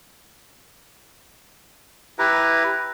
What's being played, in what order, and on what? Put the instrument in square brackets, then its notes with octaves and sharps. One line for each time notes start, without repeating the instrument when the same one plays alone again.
[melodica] E4 G4 B4 A#5